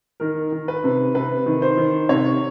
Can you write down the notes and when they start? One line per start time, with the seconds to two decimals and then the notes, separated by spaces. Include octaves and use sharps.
0.20 D#3 A#4
0.52 D#3
0.68 B4
0.84 C3
1.15 C3 B4
1.46 D#3
1.62 C5
1.77 D#3
2.09 C3 C#5